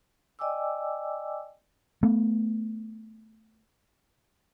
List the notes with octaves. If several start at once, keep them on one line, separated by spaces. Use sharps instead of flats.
D5 D#5 G5 G#5 D6 E6
A3 B3